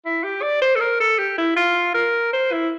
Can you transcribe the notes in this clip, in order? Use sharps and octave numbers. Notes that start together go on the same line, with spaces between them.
E4
G4
D5
C5
A4
A#4
A4
G4
E4
F4
A#4
C5
E4